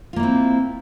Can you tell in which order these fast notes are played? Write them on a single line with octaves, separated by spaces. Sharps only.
F4 A#3 E4 C4